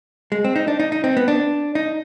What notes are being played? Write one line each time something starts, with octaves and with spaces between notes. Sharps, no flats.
G#3
C4
D#4
D4
D#4
D#4
C4
B3
D4
D#4